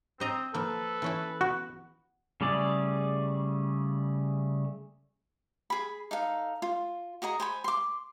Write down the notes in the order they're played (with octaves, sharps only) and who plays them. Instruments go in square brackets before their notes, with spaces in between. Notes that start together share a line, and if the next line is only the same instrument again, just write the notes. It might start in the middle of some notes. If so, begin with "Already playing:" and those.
[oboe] C4 [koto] C5 D#5 A#5
[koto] F3 A#3 [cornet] A4 [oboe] B4
[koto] E3 C#4 E4
[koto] B3 [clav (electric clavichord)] F#4
[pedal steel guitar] C#3 G3 A3 G#4 D5
[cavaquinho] G#4 B5
D#4 A4 F5
F4
F#4 G#4 D#5 A#5
C5 G#5 B5
C6 D6